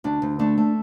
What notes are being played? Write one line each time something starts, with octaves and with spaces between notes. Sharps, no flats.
D2 D4
D2
A3 D4
A3